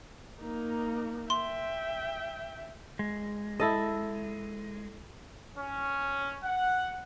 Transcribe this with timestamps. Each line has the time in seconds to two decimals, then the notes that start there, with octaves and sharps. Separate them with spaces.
0.40 A#3 D#4
1.30 E5 G5 C6
2.99 G#3
3.60 E4 A4 D#5
5.57 C#4
6.43 F#5